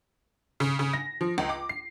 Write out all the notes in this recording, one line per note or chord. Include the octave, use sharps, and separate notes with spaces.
C#3
C#3
A#6
F3
C#2
D6
C7